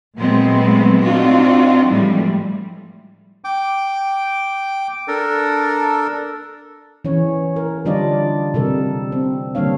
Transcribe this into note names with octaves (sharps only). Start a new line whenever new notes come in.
A#2 F#3 G#3 A3 B3 C4
C4 D4 D#4 F4 F#4
A2 E3 F3 G3 G#3
G5 D6
D4 A4 A#4
E3 C#4 C#5
A#4
D3 G3 D4 F4 D5 D#5
C3 G3 A4 A#4
C4
D3 G3 A#3 D4 C#5 F5